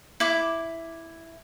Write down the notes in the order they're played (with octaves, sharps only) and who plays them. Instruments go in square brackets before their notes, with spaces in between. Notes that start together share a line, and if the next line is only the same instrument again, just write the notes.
[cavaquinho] E4 D6